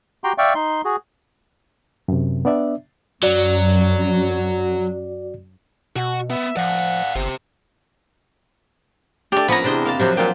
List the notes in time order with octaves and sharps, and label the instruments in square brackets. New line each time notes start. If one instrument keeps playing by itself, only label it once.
[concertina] F#4 G4 G5 A#5 C6
D5 E5 F5 G5 C#6
D#4 C6
F#4 G#4
[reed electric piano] F#2 C3
B3 D4 D5 E5
[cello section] F#2 [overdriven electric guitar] F#3 [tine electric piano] F#4 D5
[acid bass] B2 [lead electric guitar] F#4 F#5
[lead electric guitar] B3 [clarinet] E5
[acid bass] F3 [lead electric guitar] D5 F5 [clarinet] F#5
[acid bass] G1 [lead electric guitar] G4 C5
[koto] A3 D4 [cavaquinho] G4 D5
[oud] F3 A#3 C#4 [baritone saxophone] B3 [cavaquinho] B4 A#5
[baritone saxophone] E2 [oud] C3 [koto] D4 C5 D#5
[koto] A#3 F5 A5
[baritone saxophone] C3 [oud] F3 F#3 D4
[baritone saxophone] A#2 [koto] A#3 F4 G4